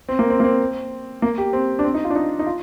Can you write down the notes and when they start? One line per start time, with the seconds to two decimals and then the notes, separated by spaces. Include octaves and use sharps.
0.09 C4
0.19 A#3
0.30 C4
0.40 A#3
0.44 C4
1.22 A#3
1.38 G4
1.53 C4
1.79 D4
1.84 C4
1.94 D#4
2.04 F4
2.10 D4
2.15 D#4
2.39 D#4
2.46 F4